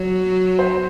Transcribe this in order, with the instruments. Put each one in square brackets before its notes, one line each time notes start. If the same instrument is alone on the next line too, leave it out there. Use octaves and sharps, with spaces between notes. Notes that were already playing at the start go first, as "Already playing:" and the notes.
Already playing: [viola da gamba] F#3 [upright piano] C#5
[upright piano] C5